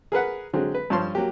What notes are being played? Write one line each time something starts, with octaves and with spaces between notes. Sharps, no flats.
G#4 A#4 B4 F#5
D3 F#3 G#3 C4
B4
G2 F3 C#5 A5 C6
F#3 A#3 G4